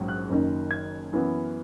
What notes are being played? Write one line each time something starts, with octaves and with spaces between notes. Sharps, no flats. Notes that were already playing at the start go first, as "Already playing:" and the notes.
Already playing: A#1 G#2 F#3 C#4
F#6
F#1 F#2 D#3
G#6
F#2 E3 B3